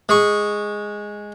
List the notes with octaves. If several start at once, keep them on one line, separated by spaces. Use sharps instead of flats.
G#3 C#6